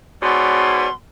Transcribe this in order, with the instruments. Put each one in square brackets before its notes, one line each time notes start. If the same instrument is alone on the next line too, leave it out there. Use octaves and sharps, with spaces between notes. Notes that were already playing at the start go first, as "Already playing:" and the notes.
[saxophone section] G#2 B2 [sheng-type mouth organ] C#5 D5 G#5 [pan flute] C6